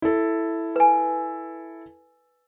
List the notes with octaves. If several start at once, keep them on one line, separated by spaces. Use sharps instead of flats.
E4 A4
B4 G#5